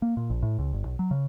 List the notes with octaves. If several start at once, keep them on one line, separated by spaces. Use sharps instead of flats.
A#3
A#2
A#1
A2
C#2
G1
B1
F#3
C#3